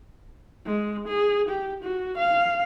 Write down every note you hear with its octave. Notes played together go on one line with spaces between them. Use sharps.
G#3
G#4
G4
F#4
F5